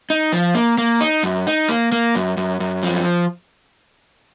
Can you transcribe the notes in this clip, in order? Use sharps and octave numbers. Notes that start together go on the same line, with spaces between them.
D#4
F3
A#3
A#3
D#4
F#2
D#4
A#3
A#3
F#2
F#2
F#2
F3